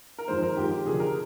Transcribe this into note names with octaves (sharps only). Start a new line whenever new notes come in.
A#4
F2 D#3 G#3 C5
A#4
F2 D#3 G#3 G4
G4
F1 F2 D3 G#4
A#4